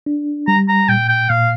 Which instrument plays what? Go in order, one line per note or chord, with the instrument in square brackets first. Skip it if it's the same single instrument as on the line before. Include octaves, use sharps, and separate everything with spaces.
[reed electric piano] D4
[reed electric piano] G3 [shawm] A#5
[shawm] A#5
[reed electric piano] A#2 [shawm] G5
[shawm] G5
[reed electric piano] A#2 [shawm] F5